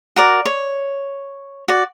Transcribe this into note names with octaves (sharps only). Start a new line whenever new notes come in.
F#4 A#4 D5
C#5
F#4 D5